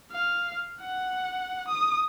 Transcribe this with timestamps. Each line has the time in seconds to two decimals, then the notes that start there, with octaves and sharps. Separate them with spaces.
0.11 F5
0.81 F#5
1.68 D#6